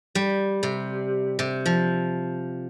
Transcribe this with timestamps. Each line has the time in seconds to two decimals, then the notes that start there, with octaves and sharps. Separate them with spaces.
0.15 G3
0.63 C3
1.39 C3
1.66 F3